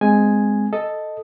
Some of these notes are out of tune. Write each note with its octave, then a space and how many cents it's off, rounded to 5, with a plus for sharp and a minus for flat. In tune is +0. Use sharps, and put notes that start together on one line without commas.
G#3 +0 C4 -15 G#5 +0
A4 +0 D#5 +0